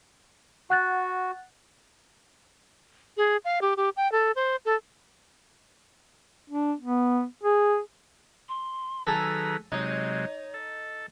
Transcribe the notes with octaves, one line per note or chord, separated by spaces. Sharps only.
F#4 F#5 F#6 A6
G#4
F5
G4
G4
G5
A4
C5
A4
D4
B3
G#4
C6
D#3 F#3 G#4 A4 B4 A#5
C3 F#3 G#3 D#4 C#5
A4